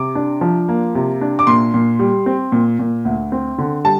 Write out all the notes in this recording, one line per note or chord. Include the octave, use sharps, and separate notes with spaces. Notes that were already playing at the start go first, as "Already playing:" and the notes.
Already playing: C3 D6
D4
F3
A#3
C3
D4
D6
A#2 C6
A#2
G3
C4
A#2
A#2
D2
C4
D3
G3 A5